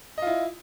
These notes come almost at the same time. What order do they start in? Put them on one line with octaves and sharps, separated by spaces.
D#5 F4 E4